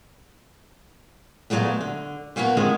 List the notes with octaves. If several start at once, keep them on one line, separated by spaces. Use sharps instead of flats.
A#2 C#3 F#3 G#3 A3 B3
D3
A#2 F#3 A#3 B3 F#4
D3 D#3 F3 G#3 A3 C4